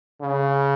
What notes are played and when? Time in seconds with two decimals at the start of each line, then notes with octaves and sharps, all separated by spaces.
0.22 C#3